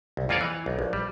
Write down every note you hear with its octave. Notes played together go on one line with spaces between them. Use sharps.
C2
F2 A#3 F4 G#4 C#5 D5
E3
B1
A#1
G3